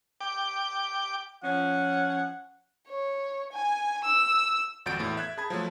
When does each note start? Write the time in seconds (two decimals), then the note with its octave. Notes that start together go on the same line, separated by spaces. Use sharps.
0.21 G5 D6
1.43 F3 C#4 F#5
2.88 C#5
3.52 G#5
4.04 E6
4.86 G#1 F2 F#4 G6 A6 D7
4.99 E2 A2
5.17 E5 F#6 G#6
5.37 G#4 A5 B5 G#6
5.50 F3 F#3 A3